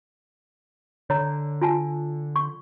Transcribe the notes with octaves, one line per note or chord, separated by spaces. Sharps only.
D3 C#5 A#5
F4 G#5 A5
C#6